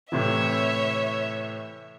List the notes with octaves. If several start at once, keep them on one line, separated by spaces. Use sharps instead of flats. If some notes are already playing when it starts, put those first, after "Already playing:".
A2 C3 E3 C#5 E5